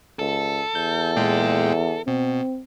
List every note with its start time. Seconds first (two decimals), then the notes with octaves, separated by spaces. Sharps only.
0.19 C#2 A4
0.75 E2 G6
1.16 A#2 G#3 G5
2.07 B2 C4